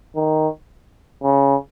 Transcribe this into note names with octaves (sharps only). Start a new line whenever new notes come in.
D#3
C#3